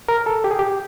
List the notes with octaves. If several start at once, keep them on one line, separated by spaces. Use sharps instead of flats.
A#4
A4
G4
G#4
G4